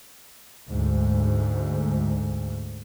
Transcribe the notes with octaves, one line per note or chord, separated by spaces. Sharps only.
D2 G#2